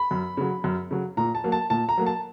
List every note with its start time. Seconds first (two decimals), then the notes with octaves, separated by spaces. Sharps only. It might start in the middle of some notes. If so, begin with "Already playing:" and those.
Already playing: B5
0.11 F#2
0.37 C#3 F#3
0.64 F#2
0.91 C#3 F#3
1.17 A#2 A#5
1.35 A5
1.44 F#3 A#3
1.52 A5
1.70 A#2 A5
1.89 A#5
1.98 F#3 A#3
2.06 A5